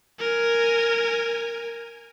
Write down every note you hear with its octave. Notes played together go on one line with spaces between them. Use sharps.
A#4 G#5